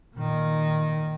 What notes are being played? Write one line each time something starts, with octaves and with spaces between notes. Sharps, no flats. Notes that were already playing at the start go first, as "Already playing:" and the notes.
A#2 D#3